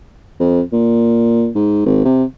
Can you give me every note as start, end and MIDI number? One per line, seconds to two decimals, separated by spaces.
0.40 0.61 41
0.73 1.50 46
1.55 1.85 44
1.86 2.04 32
2.05 2.24 48